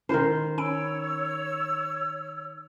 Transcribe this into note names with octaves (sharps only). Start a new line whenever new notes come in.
D#3 C#4 E4 A#4 C5
C#4 C#5 B5 E6 D7